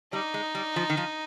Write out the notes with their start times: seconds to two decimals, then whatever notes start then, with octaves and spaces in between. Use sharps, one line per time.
0.13 G3 D#4
0.34 G#3
0.55 G3
0.76 F3
0.90 D#3
0.97 F3